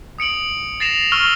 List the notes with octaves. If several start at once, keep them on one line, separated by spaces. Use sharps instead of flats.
D#6 C#7 D7 F#7
A6 A#6 C7 E7 F7
C#6 E6 F6 G7